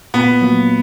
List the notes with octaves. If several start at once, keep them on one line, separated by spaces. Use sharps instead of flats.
A#2 B3
F#3 A#3